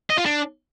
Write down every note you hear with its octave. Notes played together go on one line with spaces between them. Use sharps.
D#5
F4
D4